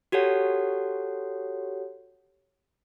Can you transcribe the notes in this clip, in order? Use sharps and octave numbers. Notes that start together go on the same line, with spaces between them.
F#4 G4 A4 C#5 F#5